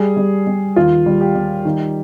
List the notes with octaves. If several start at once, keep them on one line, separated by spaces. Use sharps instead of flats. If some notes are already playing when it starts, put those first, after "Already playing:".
Already playing: G3 G#4
G3
G3
D#2 F4
G3
G4
G3
D#3